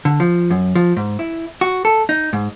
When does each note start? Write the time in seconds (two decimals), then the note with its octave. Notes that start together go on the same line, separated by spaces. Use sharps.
0.05 D3
0.20 F3
0.51 F#2
0.75 F3
0.97 G#2
1.19 E4
1.61 F#4
1.85 A4
2.09 D#4
2.33 G#2